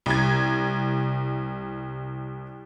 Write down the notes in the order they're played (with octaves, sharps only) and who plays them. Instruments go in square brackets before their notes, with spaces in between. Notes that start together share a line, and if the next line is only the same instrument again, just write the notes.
[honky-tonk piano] C2 G#6